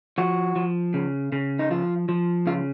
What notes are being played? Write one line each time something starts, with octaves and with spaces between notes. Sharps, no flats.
F3 F#4
F3
C#3
C#3
D#4
F3 F4
F3
C#3 F4